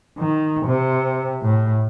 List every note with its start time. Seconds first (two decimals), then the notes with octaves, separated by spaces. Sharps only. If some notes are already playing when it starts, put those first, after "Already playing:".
0.18 D#3
0.66 C3
1.42 A2